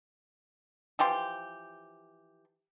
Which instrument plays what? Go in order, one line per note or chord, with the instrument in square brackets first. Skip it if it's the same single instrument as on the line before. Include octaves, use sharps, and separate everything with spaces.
[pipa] E3 F3 G4 C6